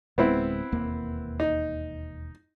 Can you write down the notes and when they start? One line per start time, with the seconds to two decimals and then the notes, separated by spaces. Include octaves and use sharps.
0.18 D1 G#3 B3 C4 E4
0.72 E1 D#2 A#3
1.40 D#4